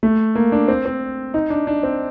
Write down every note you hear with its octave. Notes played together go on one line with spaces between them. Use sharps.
A3
A#3
D4
C4
C4
D#4
D4
D4
C4